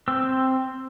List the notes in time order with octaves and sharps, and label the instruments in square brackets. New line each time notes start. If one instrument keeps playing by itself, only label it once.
[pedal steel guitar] C4 E6